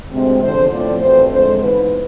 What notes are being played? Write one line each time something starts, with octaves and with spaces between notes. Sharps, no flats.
D2 C3 G#3 C4
E2 D3 F3 C5
A2 F3 A3 C4 D5
E2 B2 A3 C4 C5
F2 D3 G#3 C5
G#2 E3 B3 B4